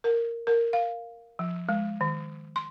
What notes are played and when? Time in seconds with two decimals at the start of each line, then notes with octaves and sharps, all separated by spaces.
0.04 A#4
0.47 A#4
0.73 F5
1.39 F3
1.69 G#3
2.01 D#3
2.56 C6